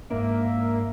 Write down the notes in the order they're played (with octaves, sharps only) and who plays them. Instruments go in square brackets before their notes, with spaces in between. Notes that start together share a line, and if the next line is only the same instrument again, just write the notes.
[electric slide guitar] G#2 D4 [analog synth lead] A#3 [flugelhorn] E5